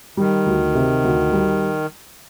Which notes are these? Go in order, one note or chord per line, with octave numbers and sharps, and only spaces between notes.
D#3 G3
D2
C3
D2
G3